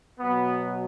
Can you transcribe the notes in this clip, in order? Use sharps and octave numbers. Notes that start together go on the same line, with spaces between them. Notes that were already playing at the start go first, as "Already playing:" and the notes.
B2 F#3 B3